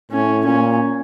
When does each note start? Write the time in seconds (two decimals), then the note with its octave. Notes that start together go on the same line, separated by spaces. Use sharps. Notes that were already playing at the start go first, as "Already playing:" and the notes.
0.11 A2 C#4
0.45 A#2 C#4